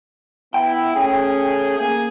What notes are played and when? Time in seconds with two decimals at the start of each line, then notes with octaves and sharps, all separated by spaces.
0.54 B3 E4 G5
0.96 A3 C#4 G#4
1.79 A#3 G#4